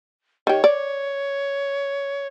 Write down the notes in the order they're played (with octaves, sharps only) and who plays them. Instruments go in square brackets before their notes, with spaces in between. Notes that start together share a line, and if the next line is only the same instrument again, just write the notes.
[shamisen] D#3 G4 [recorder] C#5
[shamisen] D5